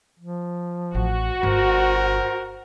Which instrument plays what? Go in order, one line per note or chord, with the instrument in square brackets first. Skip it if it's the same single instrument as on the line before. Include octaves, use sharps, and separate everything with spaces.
[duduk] F3
[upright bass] A1 [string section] F#4
[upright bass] G1 [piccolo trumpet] A#4 [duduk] C5